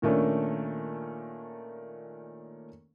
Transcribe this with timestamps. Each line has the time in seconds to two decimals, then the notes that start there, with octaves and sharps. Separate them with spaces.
0.02 A#2 D#3 A3 C#4 D4